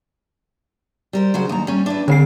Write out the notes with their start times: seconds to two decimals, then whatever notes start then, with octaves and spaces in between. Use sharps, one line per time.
1.13 G3 A#4 C5
1.34 C#3 F#3 C5
1.49 D#2 A#5
1.67 G3 C#4
1.86 D4 E4 B4
2.08 D3 C4 G#4 C7